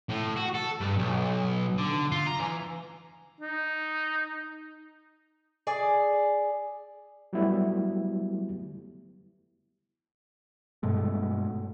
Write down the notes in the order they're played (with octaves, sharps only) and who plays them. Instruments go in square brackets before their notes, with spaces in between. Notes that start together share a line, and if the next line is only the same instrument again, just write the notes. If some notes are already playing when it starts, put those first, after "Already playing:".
[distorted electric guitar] A2
F#4
A4
G2
B1
D3
F4
A#5
E3
[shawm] D#4
[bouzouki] G#4 D5 G#5
[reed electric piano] F#3 G3 A3 B3 E4
[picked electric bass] G2 B2 G#3 A3